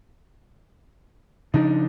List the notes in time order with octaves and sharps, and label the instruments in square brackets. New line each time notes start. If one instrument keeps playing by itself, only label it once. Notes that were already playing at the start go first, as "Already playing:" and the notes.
[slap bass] C#3 F3 D4 [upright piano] D#4